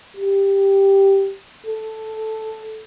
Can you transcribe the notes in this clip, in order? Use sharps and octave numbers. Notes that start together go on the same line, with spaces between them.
G4
A4